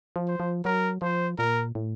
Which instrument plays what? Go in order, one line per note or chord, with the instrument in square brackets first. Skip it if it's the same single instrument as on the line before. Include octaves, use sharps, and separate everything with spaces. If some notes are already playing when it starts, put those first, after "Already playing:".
[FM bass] F3
[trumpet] C5
[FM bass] F3
[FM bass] F#3 [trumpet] A#4
[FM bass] F3 [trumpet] C5
[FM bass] A#2 [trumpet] A#4
[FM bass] A2